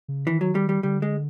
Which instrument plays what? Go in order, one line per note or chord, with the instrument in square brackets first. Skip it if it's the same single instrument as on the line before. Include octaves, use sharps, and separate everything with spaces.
[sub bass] C#3
[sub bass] D#3 [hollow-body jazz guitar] E3
[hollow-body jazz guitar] F#3
G3
G3
[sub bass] D3 [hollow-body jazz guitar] G3
[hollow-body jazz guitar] G#3